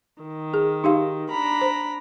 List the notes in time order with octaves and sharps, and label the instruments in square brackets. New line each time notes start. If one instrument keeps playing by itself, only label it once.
[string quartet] D#3
[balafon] G#4
D#4 G4 F5
[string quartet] D4 A#5 B5
[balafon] C5